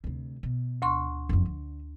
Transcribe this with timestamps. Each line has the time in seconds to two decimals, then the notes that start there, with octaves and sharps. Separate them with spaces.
0.04 D2 C3
0.43 B2
0.82 D2 C6 C#6
1.29 F#1 F2
1.46 D3